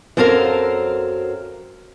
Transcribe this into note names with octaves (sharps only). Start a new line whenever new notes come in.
F#2 F#3 C4 A4 A#4 F5